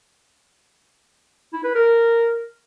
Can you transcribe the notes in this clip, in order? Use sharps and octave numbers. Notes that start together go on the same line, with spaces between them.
E4
B4
A#4